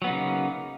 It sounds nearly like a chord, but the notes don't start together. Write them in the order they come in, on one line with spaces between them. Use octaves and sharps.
F#3 B3 D#4 C#3 A#3